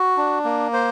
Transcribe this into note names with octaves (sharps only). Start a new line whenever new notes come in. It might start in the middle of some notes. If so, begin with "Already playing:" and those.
Already playing: F#4
D4
A#3
C5